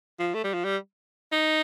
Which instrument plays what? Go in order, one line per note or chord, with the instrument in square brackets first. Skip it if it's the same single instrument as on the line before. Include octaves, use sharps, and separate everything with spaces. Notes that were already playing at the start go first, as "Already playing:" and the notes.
[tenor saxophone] F3
A3
G3
F3
G3
D#4